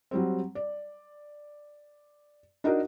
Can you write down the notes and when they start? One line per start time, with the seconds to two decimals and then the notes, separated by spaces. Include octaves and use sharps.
0.11 F#3 G3 C4
0.55 D5
2.64 D4 D#4 F#4 A#4